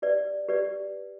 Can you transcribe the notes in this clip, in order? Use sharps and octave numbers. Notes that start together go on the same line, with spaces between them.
G4 B4 D5
G4 B4 D5